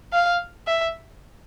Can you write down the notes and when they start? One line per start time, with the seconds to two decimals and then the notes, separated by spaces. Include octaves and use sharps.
0.13 F5
0.67 E5